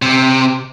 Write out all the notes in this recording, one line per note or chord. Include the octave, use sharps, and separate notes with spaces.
C3